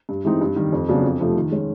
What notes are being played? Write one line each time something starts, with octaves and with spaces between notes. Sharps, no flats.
G2
E3 G#3 C4 D#4
G2
D#3 G3
F2
C#3 F#3 B3 D4
F2
C3 F3 A3
D#3
G#3 C#4